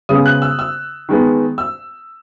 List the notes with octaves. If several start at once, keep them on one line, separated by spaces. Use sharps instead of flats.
C#3 G#3 B3 D#6
F#6
E6
E6
D#3 G#3 B3
E6